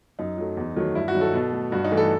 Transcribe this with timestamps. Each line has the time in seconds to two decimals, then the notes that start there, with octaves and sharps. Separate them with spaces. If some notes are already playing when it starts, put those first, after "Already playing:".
0.19 F#2 D#4
0.38 F#3 A3
0.57 E2
0.76 D#3 F#3 A3
0.95 G2 E4
1.08 F#4
1.14 D#3 F#3
1.21 A4
1.33 B2
1.52 A3
1.72 G2 F#4
1.85 D#4
1.91 E3 A3
1.97 A4